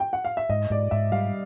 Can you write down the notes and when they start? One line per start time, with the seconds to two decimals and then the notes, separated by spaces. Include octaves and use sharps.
0.00 G5
0.13 F#5
0.25 F5
0.37 E5
0.49 G#2 D#5
0.70 G#2 D5
0.91 G#2 E5
1.12 G3 F5